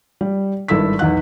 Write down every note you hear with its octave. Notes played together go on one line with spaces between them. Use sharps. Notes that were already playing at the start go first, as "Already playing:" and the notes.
G3
G#1 G2 E4 A4 E6 B6
B1 E2 D#4 F#5 F#6